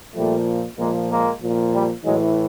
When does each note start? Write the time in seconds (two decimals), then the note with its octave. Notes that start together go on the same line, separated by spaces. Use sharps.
0.15 A#2 F3 G3 A3
0.78 A#2 F3 G#3 A#3
1.10 G#3 A#3
1.41 A#2 F3
1.73 G3
2.04 A2 E3 F#3 G#3